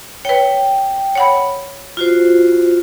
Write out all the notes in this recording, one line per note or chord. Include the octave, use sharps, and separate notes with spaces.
B4 C#5 G5
C#5 F#5 B5
F4 F#4 C5